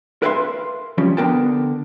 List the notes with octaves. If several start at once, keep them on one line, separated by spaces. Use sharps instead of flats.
A#4 B4 E5 F5 G5 C6
F3 G3 C#4
D3 B3 A#4 G5 A5